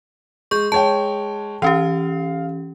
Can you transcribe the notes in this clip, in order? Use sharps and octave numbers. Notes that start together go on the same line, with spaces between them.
G#3 C#6 G6
G#3 C#5 G5 A5
E3 C#4 G4 F5